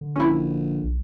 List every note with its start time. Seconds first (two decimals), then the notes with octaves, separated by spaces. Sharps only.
0.01 D3
0.16 A#1 C#4 E4
0.83 B1